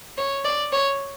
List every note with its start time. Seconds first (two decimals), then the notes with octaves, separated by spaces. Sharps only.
0.18 C#5
0.45 D5
0.73 C#5